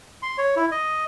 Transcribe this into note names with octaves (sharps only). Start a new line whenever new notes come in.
C6
C#5
E4
D#5